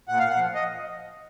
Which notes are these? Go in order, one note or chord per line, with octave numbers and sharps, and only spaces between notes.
A#2 F#5
F5
F#5
F3
D#5